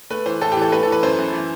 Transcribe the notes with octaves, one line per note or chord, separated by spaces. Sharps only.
A3 B4
E3 C5
A2 A4
G4
E3
A4
A3 B4
A4
E3
B4
F#2 C5
F#2
E3